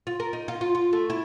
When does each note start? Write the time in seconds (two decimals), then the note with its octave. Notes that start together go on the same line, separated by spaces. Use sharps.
0.07 F4
0.20 A#4
0.33 D#4
0.48 F4
0.61 F4
0.75 F4
0.93 A3
1.10 E4